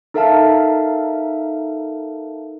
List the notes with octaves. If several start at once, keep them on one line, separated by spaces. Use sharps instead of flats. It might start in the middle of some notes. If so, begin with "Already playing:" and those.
D#4 A4 A#4 E5 F5 A5